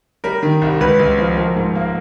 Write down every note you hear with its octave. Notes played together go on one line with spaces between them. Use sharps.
G3 A#4
D#3
C2
C#2 B4
C#2
F3
F3 A#4
G#2
A#3